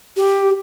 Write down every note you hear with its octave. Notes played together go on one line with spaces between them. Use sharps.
G4